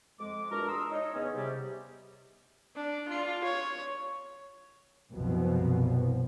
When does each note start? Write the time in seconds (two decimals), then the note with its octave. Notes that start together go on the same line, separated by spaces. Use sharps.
0.20 F2 G#3 D6
0.50 E2 A#2 D4 F#4 A#4
0.68 A#5 C6 D#6 E6
0.91 D#4 C#5 D#5
1.14 E2 C#3 B3 C#4
1.34 C3 G3
2.75 D4
3.09 F4
3.44 C#5
5.11 C2 F#2 B2 F3